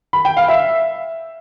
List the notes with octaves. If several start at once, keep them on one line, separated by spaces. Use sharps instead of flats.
B5
G5
F5
E5